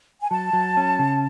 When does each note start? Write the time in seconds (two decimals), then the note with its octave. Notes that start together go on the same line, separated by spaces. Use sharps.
0.21 G#5
0.30 F#3 A5
0.53 F#3
0.77 C#4
0.99 C#3